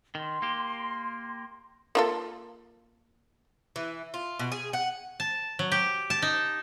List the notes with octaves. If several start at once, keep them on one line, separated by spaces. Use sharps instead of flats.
D#3 C6
A#3 G4
A#3 F4 A4
E3
F4
B2
G#4
F#5
A5
F#3
G4
A5
D#4